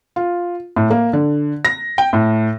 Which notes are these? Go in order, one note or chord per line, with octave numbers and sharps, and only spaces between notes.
F4
A2
A#3
D3
A#6
G5
A2